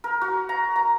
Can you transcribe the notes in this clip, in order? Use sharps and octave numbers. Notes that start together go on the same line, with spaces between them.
A#4
F#4
A#5
A#5